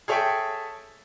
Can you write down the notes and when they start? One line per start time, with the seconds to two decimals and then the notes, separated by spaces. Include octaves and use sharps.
0.08 G#4 A4 C#5 E5 G5